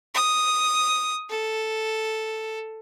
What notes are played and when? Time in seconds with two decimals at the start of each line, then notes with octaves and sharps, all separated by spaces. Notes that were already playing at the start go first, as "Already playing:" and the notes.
0.15 D#6
1.30 A4